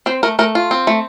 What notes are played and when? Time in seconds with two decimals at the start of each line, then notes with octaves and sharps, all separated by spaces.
0.06 C4 C5
0.23 A3 A#4
0.39 A3 A#4
0.55 F4
0.71 C4
0.87 A3